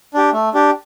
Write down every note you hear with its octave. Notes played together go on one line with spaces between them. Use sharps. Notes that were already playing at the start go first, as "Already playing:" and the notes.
D4 G4
A3
D4 G4